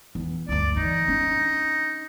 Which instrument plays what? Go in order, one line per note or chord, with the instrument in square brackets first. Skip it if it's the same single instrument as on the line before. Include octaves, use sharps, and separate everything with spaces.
[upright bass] E2
[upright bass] D2 G2 [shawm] D5
[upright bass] E3 [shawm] D#4
[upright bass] C#4 D4